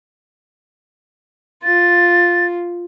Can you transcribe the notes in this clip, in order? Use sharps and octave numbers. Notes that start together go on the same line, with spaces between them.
F4 A6